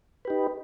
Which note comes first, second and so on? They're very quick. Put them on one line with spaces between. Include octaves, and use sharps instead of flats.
B4 G4 D#4